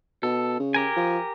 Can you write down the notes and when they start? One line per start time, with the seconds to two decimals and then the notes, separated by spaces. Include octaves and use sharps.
0.23 B2 A4
0.60 C#3
0.74 G4 A#4 G#5
0.96 F3